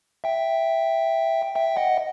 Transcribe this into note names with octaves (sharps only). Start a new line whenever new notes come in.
E5 G5
E5 G5
D#5 F#5